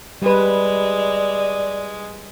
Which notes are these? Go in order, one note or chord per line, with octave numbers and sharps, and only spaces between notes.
G3 G#3 B4 D5